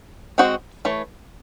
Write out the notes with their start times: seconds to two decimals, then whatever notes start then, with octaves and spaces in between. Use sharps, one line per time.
0.38 G#3 C4 F#4 C5 D#5
0.85 E3 A3 C#5